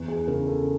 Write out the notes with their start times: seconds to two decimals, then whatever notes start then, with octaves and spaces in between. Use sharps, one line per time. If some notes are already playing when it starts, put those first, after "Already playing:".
Already playing: E2
0.08 G#4
0.28 C#3 A#4
0.47 A4